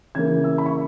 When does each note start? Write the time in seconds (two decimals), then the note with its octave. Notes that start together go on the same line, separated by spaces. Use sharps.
0.15 C#3 E3 A#3 G#6
0.44 E6
0.58 B5
0.66 C#6